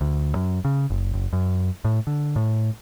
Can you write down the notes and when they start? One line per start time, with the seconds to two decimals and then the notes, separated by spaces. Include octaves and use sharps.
0.01 D2
0.35 F#2
0.65 C#3
0.90 F#1
1.14 F#1
1.33 F#2
1.85 A2
2.07 D3
2.36 A2